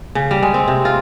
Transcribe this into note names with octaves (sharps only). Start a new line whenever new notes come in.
C#3
G3
G#3
C4
C3
F4